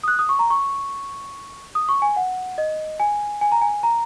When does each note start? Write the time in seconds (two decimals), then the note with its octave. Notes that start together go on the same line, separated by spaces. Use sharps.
0.03 D#6
0.08 F#6
0.19 D#6
0.29 C#6
0.39 A#5
0.50 C#6
1.75 D#6
1.89 C#6
2.02 G#5
2.16 F#5
2.58 D#5
3.00 G#5
3.41 G#5
3.52 A#5
3.62 G#5
3.83 A#5